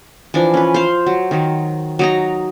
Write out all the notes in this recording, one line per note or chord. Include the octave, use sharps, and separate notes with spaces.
E3 F3 D4
C#4 B4
C5 F5
F#3
D#3 F#3
F#3 D#4 A#5